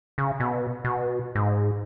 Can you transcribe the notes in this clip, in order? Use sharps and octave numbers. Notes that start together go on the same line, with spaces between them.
C#3
B2
B2
G#2